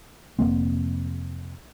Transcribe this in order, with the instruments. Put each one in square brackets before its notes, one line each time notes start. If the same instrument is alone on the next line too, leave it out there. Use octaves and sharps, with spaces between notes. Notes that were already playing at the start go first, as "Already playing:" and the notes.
[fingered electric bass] F1 A#2 A#3 C4